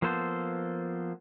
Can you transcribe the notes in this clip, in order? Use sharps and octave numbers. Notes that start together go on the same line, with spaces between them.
F3 A#3 B3 A4 C5